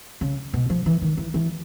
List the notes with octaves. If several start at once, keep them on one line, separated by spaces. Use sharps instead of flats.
C#3
B2
F3
E3
D#3
E3
E3